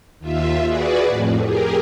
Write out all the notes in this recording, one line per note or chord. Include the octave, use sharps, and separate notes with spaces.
D#2 F4 E5
F#4 G#4 B4 D5
F2 A2
G4 G#4 A#4